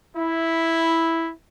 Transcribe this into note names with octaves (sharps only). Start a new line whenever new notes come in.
E4